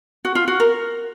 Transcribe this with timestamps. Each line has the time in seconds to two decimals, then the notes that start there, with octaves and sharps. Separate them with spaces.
0.25 F#4
0.35 F4
0.48 F#4
0.60 A#4